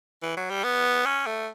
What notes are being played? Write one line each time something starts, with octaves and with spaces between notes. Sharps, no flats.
E3
F#3
G3
B3
C#4
A3